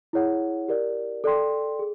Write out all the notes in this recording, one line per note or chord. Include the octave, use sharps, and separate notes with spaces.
E4 G#4 C#5 F#5
G4 A#4 D5
A4 D5 G5 C6
G#4